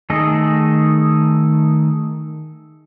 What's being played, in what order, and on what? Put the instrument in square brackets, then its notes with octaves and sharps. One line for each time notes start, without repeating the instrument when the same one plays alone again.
[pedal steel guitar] D#3 A3 G#4 A4 D#5